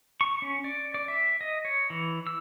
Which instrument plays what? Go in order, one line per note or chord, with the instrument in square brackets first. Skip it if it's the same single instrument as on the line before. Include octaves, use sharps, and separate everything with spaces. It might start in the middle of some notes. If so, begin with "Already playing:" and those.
[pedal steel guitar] C#6
C#4
D5
D5
E5
D#5
C#5
E3
E6